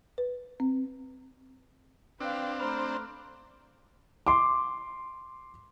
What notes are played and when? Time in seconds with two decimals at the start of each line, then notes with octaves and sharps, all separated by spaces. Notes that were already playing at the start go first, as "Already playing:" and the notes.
0.18 B4
0.60 C4
2.20 C4 D4 B4 F5 G5 E6 F#6
2.60 A3 C5 A#5 B5 F6
4.27 C6 D6